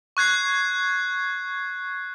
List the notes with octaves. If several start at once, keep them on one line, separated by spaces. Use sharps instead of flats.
C#6 F#6 G#6 C7